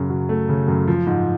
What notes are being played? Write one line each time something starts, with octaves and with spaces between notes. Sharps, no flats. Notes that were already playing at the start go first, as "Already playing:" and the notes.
Already playing: F#2 C#3
F#3
A3
C#3
F#2
F3
G#2